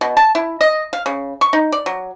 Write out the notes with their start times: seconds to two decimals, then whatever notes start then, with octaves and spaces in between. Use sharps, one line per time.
0.01 B2
0.17 A5
0.35 E4
0.61 D#5
0.93 F5
1.06 C#3
1.41 C#6
1.53 D#4
1.72 D5
1.86 F#3